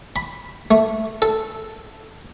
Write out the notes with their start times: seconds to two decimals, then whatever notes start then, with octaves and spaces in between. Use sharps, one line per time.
0.16 B5
0.71 A3
1.22 A4